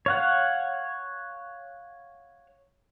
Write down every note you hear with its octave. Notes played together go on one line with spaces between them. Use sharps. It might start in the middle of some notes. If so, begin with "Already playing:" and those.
C#5 F5 F#5